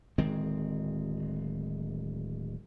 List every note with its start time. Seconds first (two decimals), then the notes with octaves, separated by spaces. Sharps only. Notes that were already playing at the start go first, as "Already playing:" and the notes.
0.18 D1 D#3 G#3 C4